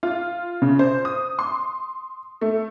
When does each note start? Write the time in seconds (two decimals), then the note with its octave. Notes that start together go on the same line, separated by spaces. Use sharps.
0.03 F4
0.62 C#3
0.79 C5
1.05 D#6
1.39 C6
2.41 A3